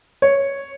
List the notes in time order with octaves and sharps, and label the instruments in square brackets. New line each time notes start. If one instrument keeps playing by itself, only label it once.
[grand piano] C#5